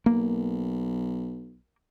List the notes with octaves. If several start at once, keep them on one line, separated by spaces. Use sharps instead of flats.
B1 A#3